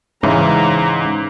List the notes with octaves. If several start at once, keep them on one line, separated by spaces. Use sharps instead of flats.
G#2 C#3 E3 A#5